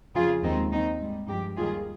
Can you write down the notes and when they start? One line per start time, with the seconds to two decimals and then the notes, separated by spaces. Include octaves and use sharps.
0.15 F2 C#3 F3 F4 G#4
0.43 D#2 D#3 G#3 C4 D#4
0.71 D#2 D#3 G#3 C4 D#4
1.00 G#2 G3
1.28 G2 F3 G#3 D#4 G4
1.57 D#2 D#3 G3 F4 G#4